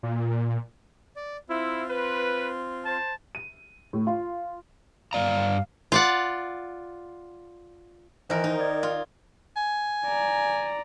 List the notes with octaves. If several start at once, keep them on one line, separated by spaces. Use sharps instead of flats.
A#2
D5
C4 E4 F4
B4
C5 A5
D#7
A2
F4
G2 D5 F5 A#5
F4 D5 F#5
D#3 E3 A#4 C5
D#4
D5 G#6
F4
G#5
D5 A#5